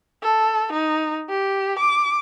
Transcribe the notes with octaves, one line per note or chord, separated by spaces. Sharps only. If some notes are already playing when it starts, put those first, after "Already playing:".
A4
D#4
G4
D6